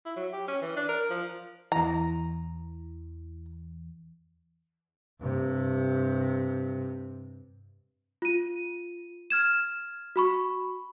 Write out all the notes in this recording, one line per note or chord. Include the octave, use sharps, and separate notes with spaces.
E4
F#3
G4
C#4
E3
D4
A#4
F3
E2 E3 A#5
G2 C3
F4 D#7
F6 G#6 E7
F#4 B5 C#6